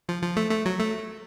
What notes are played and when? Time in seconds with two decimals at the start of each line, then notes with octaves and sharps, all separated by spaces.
0.09 F3
0.23 F3
0.37 A3
0.51 A3
0.66 F#3
0.80 A3